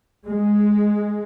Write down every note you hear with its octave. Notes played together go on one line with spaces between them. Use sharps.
G#3